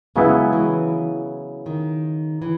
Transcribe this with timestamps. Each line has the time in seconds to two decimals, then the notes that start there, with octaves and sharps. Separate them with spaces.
0.16 C#3 F#3 G#3 B3 E4
0.53 E3
1.66 D#3
2.42 E3